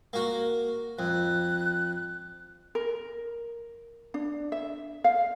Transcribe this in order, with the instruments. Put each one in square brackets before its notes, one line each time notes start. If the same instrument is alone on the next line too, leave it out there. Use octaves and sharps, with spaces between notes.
[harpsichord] A#3 F#4
[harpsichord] F2 [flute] F#6
[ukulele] A#4
D4
E5
F5